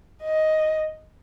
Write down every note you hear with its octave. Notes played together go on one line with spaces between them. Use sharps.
D#5